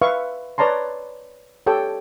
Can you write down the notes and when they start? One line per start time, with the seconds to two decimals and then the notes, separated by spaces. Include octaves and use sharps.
0.02 B4 E5 F5 C#6
0.58 B4 C#5 D5 A5 A#5 C6
1.67 G4 A4 C#5 G5